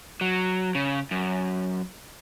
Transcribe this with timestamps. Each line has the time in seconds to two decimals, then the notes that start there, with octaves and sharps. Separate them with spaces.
0.21 F#3
0.75 C#3
1.11 F#2